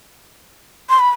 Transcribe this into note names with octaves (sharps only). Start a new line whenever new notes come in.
C6
B5